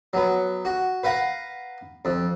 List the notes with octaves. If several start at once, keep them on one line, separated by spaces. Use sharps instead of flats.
F#3 B3
F#4
B4 F5 F#5 A#5
F2